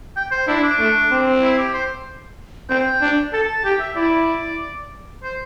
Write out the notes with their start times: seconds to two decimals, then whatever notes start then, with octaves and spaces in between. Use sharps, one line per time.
0.16 G5
0.32 C5
0.48 D4 E4
0.63 D4
0.79 A3
1.11 C4
1.43 E4
1.58 G4
1.74 C5
2.70 C4 G5
3.01 D4
3.33 A4 A5
3.49 A5
3.64 G4 G5
3.80 E5
3.96 E4 D5
5.23 C5